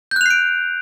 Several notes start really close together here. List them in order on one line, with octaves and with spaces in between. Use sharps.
G6 F#6 F7 C7 D7